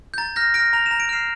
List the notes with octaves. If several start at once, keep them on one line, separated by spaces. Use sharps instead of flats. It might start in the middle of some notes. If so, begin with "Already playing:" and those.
G6
A#5 A6
F6 G6 A#6
F6 A#6 D7
A#5 F7
A#5 E7
D7
F6 C7 E7